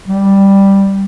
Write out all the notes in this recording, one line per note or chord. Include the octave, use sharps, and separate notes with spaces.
G3